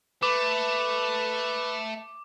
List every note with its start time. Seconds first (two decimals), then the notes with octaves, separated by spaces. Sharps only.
0.23 A3 B4 D6